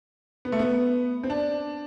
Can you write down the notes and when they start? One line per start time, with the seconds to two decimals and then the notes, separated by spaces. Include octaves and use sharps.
0.45 B3
0.52 A3
0.59 B3
1.23 C4
1.30 D4